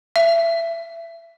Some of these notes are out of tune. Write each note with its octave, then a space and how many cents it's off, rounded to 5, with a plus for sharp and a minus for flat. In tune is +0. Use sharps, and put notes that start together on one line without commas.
E5 +25